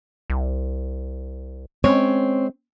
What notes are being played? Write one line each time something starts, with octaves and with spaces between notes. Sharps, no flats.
C2
G#3 C4 C#4 C#5